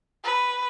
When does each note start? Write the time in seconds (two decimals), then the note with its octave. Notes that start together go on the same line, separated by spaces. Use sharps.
0.24 B4